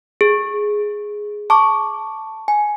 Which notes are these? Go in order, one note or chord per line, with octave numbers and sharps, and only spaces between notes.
G#4
A5 C#6 D6
G#5